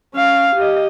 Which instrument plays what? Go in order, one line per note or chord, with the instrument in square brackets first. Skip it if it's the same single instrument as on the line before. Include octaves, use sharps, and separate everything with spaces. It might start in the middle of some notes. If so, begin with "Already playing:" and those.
[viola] C#4 F5
G4 D#5